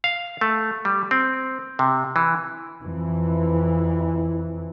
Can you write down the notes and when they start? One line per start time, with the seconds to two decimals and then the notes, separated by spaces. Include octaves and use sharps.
0.04 F5
0.41 A3
0.85 G3
1.11 C4
1.79 C3
2.16 E3
2.81 F2 E3